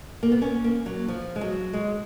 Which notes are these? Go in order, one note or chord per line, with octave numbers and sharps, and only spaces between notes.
A#3
B3
C#4
A#3
F#3
F3
G#3
F#3
G#3